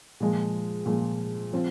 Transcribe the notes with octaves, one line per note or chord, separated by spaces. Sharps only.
A#2 F3 G#3
A#2 F3 G#3
F3 C4 F4